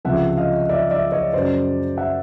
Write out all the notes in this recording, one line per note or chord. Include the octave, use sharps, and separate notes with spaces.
C#2 C3 F3 E5 F#5
D#5 F5
D5 E5
D5 E5
C#5 D#5
F#2 C#3 F#3 C5 D5
E5 F#5